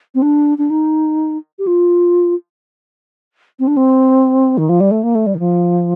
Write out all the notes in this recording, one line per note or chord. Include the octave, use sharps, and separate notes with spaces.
C4
D4
D4
D#4
G4
F4
C4
D4
C4
D#3
F3
G3
A3
A#3
A3
G3
D#3
F3